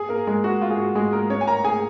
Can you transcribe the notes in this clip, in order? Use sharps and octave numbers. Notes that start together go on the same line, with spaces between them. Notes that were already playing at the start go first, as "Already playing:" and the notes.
Already playing: G#4 G#5
A#3 A#4
G#3 G#4
F#4
F4
G#4
F#4
G#3 G#4
A#3 A#4
C#4 C#5
G#5
A#4 A#5
G#4 G#5